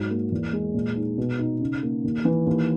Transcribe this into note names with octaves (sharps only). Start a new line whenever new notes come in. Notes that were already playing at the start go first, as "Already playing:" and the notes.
Already playing: G#2 F#3
A#3
E2
G#3
A#2
D#4
B2
D#4
C#3
A#3
D#2
E3
D#2